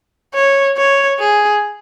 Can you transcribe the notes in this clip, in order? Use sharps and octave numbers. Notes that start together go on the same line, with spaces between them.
C#5
C#5
G#4